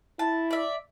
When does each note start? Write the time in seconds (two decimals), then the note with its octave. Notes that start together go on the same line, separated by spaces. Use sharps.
0.19 E4 A5
0.51 D5 E5